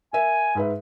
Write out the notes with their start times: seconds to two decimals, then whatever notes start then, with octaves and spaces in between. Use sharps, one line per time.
0.13 A#4 E5 G#5
0.55 G#2 B4 E5